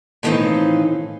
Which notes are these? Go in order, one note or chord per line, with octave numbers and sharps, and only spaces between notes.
A2 D#3 E3 C4 D#4 F4